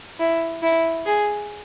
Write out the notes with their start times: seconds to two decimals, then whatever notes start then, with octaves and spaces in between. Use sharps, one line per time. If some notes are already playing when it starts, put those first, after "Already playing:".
0.20 E4
0.63 E4
1.06 G#4